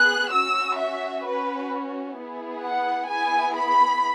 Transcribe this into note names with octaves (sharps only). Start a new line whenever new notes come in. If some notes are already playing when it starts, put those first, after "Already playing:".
Already playing: B3 G#4 F#6
C#4 F#4 E6
E5
C#4 F#4 B4
B3 E4 G#4
F#5
B3 E4 G#4 G#5
B5